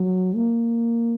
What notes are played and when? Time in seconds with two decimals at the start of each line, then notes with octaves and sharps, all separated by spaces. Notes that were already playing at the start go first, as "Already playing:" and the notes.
Already playing: F#3
0.36 A#3